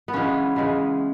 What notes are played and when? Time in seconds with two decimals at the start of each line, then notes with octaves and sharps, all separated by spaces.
0.08 B3
0.13 C#3 E3 G#3 C#4
0.56 C#3 E3 G#3